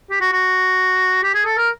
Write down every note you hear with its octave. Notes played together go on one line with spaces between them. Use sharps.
G4
F#4
F#4
G4
G#4
A4
A#4